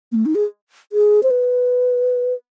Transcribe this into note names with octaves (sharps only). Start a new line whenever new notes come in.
A#3
A3
D#4
G#4
G#4
C5
B4